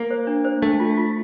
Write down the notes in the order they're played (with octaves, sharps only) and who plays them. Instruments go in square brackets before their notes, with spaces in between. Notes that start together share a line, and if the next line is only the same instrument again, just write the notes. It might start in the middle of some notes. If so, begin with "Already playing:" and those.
Already playing: [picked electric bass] A#3
[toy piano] C5
D4
C5
[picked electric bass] A3 [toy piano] D4
[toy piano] F4
F4